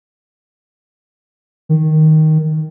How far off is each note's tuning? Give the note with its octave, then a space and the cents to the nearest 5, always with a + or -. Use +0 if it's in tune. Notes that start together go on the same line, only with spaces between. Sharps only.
D#3 +5